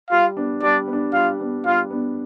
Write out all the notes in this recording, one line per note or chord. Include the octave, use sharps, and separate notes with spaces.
G3 F4 F5
B3 D4
G3 D4 D5
B3
D4
G3 F4 F5
B3 D4
G3 F4 F5
B3 D4